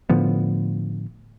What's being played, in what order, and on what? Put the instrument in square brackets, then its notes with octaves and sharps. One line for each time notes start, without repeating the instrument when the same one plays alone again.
[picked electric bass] A2 D3 F3 B3